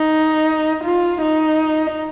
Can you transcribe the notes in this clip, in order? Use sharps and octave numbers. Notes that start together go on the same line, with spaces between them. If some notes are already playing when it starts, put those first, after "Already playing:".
Already playing: D#4
F4
D#4